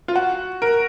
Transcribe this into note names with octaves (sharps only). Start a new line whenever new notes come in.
F4
F#4
A#4